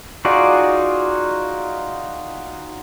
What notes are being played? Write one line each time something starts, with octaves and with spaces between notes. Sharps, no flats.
D#4 F4 F#4 G#4 D5